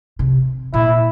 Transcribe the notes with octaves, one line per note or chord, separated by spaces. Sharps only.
C3
A#2 E4